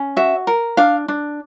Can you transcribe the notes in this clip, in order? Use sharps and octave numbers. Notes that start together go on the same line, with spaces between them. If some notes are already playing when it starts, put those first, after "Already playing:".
Already playing: C#4
F#4 E5
A#4
D4 F5
D4